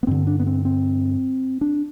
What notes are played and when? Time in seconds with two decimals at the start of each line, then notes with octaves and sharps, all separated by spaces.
0.03 B3
0.07 G2 D3 C4
0.27 D4
0.40 B3
0.47 C4
0.65 C4
1.61 D4